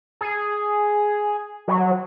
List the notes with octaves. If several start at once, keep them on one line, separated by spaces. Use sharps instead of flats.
G#4
F#3